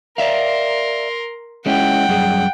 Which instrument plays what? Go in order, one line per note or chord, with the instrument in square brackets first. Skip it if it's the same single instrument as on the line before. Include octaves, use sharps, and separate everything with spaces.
[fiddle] A#4 C6 [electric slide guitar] D5 E5 F5
[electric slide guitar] G#3 C#4 E4 [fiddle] F#5 G5
[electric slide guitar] F#2 G3 G#4